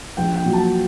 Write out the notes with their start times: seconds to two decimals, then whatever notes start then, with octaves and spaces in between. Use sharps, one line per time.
0.17 A#1 G5
0.36 G5
0.45 A#2 F#3
0.53 A5